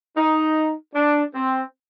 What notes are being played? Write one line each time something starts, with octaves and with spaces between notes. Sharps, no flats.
D#4
D4
C4